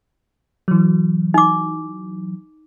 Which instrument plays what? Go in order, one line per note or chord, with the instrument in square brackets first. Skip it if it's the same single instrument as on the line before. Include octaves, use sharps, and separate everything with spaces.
[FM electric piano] E3 F#3
[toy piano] D#4 D6